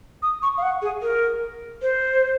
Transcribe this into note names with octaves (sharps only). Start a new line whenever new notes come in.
D#6
C#6
F5
F#5
G#4
A#4
C5